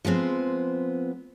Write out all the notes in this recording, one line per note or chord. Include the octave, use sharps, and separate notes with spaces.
F3 G#3 B3 C4